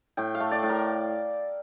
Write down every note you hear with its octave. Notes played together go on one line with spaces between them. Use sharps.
A2 G5
F5
A3
D5
A2
A#4